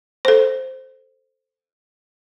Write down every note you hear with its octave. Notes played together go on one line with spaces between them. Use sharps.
A4 C5